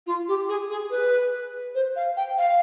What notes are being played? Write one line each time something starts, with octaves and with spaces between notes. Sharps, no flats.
F4
G4
G#4
G#4
B4
C5
F5
G5
F5